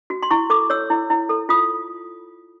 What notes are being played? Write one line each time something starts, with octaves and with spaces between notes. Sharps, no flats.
F#4
C6
E4 C#6
A4 D6
C#5 E6
E4
E4
A4
F4 D#6